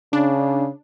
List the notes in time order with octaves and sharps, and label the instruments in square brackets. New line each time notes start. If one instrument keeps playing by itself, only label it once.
[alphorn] C#3 [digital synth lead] D4